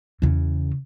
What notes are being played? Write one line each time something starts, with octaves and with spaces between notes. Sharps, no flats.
E2 C#3